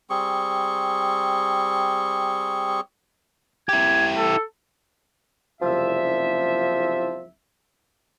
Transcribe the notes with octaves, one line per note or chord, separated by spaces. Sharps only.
G3 C4 G#4 C#6
E4 G4 G#6
A4
F#1 C2 F3 E5